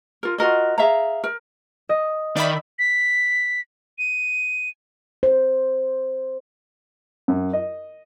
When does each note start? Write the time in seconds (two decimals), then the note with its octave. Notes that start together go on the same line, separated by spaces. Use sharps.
0.23 F4 A#4
0.38 F4 F#4 A#4 D#5
0.78 G#4 E5 F5 A#5
1.24 A#4
1.89 D#5
2.37 D#3 D5 E5 B5
2.79 B6
3.99 D#7
5.23 C5
7.28 F#2
7.53 D#5